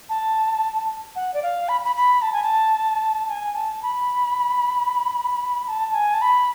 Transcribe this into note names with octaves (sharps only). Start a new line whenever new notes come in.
A5
F#5
D5
F5
B5
B5
B5
A5
G#5
A5
G#5
A5
B5
A5
G#5
A5
B5